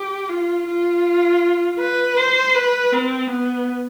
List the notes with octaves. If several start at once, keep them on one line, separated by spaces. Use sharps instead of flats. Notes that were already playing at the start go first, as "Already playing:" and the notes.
Already playing: G4
F4
F4
B4
C5
B4
C4
B3